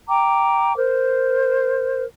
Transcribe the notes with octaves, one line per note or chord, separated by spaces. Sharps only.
G5 A#5 D6
A#4 C5